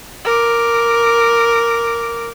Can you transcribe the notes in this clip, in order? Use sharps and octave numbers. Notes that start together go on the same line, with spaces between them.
A#4 D6